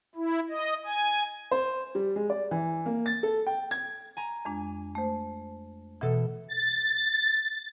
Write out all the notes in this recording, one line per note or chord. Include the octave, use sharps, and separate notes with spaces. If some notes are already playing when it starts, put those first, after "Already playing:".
E4
D#5
G#5
C5
G3
G#3
D5
E3
A#3
A6
A4
G5
G#6
G#5 A#5
F2 G#3 D4
A3 C5
B2 E3 A4
A6